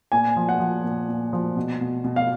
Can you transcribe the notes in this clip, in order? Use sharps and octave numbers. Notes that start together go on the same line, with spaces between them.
A#2 G#5
F3
F#5
F3
A#2
A#2
F3
B2
B2
B2
F5